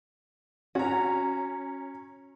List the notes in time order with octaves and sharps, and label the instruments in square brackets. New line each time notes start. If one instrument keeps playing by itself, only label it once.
[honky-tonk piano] C#4 A#5 [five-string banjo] F#4